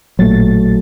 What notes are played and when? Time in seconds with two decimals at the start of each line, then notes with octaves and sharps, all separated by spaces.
0.19 A1 A#2 F#3 A3 A6